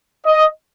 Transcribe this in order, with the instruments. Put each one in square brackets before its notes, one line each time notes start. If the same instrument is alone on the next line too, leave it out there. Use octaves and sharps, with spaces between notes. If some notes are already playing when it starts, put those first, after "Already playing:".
[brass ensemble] D#5